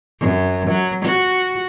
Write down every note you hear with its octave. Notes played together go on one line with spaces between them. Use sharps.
F#2
F#3
F#4